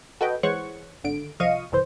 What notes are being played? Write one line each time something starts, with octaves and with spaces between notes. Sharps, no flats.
F#4 A4 B4 D#5 G5
E3 G#3 C5 C#5 F#5 C#6
G#1 D3 D7
C2 F3 D#5 F5 C#6 D#7
G1 C2 E3 C5